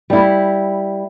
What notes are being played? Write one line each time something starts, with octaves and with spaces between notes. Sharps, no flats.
G3 E4